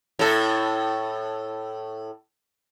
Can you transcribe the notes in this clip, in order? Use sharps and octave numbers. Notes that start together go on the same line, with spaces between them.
A2 A4